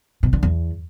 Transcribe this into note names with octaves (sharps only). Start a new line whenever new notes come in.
B2
D3
E2